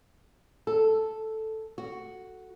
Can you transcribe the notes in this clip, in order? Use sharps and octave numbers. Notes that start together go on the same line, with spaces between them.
A4
F#4